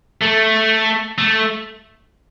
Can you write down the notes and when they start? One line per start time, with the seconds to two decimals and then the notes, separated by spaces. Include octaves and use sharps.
0.21 A3
1.18 A3